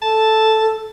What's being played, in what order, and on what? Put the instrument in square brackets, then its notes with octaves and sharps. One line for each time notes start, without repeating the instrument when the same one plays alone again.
[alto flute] A4 [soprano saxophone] A5